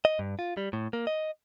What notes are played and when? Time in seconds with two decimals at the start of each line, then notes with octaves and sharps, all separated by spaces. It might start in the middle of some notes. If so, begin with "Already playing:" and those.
0.05 D#5
0.19 G2
0.39 F4
0.57 G3
0.73 A2
0.93 A#3
1.07 D#5